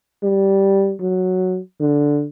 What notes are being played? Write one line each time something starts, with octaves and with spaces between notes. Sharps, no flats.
G3
F#3
D3